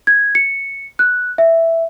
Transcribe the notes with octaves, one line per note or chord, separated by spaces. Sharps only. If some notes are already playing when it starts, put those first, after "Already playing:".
G#6
C#7
F#6
E5